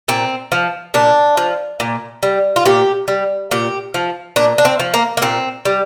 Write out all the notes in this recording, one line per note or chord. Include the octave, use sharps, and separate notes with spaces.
A#2 C4
F3
A#2 D4
F3
A#2
G3
F4
A#2 G4
G3
A#2 G4
F3
A#2 D4
D4
C4
F3
A#3
A#3
A#2 C4
G3